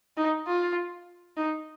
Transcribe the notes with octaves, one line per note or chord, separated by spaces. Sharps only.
D#4
F4
D#4